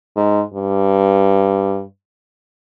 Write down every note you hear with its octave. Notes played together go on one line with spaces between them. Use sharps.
G#2
G2